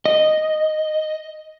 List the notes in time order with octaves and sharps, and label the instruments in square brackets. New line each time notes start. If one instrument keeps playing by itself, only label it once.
[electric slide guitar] D#5